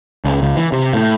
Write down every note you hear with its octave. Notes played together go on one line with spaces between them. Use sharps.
C#2
C#2
E3
C3
A2